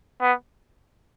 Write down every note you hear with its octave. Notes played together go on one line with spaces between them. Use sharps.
B3